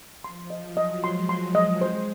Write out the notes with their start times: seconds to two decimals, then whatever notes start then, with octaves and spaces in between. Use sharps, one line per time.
0.24 F3 C6
0.50 D#5
0.64 F#3
0.77 D#5
1.04 G#3 C6
1.29 C6
1.42 G#3
1.55 D#5
1.81 G#3 C5